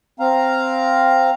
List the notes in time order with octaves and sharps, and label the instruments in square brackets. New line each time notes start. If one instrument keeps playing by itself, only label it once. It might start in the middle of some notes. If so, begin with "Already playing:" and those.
[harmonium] C4 F5 A#5